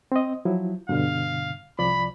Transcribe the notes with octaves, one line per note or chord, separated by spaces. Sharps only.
C4 D#5
F3 F#3 E4
G2 B2 D3 F5
C2 F3 D5 B5